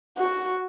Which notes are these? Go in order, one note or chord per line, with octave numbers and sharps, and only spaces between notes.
F#4